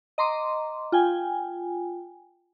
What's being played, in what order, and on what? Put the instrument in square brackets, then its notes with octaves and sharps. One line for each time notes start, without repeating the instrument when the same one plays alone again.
[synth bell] D#5 A#5 C6 D6
F4 G5 G#5